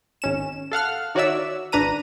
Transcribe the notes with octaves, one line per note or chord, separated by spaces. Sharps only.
G#1 C#4 E7
A4 F5 F#5 F6
D#3 F#4 C#5 D5 E5 E6
G#1 D4 B4 A#5 D#7